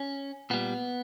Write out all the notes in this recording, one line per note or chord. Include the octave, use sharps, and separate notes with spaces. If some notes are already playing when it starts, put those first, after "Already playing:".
Already playing: C#4
A#2 G3 B3